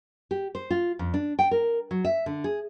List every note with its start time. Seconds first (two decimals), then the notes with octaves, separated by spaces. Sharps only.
0.31 G4
0.55 C5
0.70 F4
0.99 F2
1.14 D4
1.39 G5
1.51 A#4
1.91 F#3
2.05 E5
2.26 D3
2.44 G#4